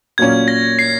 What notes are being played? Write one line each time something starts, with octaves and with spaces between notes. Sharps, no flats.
A#2 F#3 A#3 C#4 G#6
A#6
C7